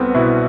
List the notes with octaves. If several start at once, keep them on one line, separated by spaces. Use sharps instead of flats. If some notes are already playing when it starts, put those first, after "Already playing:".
Already playing: C2 B3 C4 A4
B2 E4